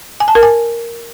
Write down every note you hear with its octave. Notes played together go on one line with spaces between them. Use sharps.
G#5
A5
A#4
G#5